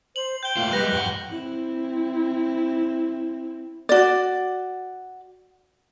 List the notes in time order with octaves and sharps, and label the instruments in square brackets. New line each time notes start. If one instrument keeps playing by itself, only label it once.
[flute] C5 [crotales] F#7
[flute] G5 [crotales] G6 G7
[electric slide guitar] A3 A#3 F4
[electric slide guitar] G3 G#3 [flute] B4 [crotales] F#6 A#6
[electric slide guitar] F2 G#2 F#5 [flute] G5
[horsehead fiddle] C4 E4
[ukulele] F#4 D5